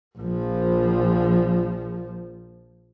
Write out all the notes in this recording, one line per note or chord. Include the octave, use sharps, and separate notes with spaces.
A#1 F3